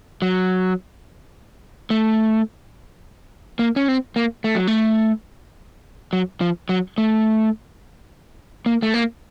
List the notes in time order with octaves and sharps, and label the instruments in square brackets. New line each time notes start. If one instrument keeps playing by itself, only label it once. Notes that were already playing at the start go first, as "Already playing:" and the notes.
[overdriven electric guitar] F#3
A3
A#3
C#4
C4
A#3
A3
F#3
A3
F#3
F3
F#3
A3
A#3
A3
A#3